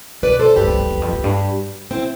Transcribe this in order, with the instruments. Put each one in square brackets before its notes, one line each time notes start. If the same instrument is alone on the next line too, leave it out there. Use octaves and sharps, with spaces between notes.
[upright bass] B2 [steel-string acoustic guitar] B4 D5
[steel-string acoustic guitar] A4 C5
[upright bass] G2 [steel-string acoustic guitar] G4 B4
[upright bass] F2
F2
E2
F2
F2
G2
[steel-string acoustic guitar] C4 E4